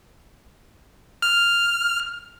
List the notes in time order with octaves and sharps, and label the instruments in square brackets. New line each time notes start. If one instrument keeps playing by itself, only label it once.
[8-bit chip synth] F6